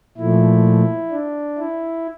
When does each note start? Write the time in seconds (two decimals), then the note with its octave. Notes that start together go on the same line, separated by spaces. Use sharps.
0.17 A#2 F3 A3 E4
1.11 D4
1.58 E4